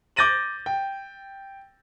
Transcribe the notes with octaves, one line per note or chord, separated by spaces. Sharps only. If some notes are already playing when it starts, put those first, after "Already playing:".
D6 G6 A6 A#6 D#7 F#7
G5